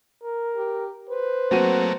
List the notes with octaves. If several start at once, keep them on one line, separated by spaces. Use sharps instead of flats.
A#4
G4
B4 C5
F#3 A3 A#3 C4 F#4 D#7